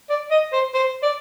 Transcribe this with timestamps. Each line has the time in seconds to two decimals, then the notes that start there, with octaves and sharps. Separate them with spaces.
0.09 D5
0.31 D#5
0.53 C5
0.74 C5
1.02 D5